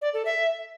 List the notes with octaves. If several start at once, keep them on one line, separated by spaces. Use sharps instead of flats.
D5
A4
E5